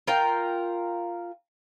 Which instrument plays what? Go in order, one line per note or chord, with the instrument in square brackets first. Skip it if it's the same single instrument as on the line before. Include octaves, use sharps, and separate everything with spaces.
[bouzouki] F4 A#4 G5